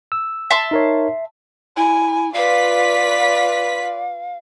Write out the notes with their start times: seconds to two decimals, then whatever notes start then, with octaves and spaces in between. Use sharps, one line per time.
0.12 E6
0.50 E5 A5 C6
0.71 D#4 A#4 C#5
1.77 E4 G#5
2.34 F4 B4 D5 F5 B6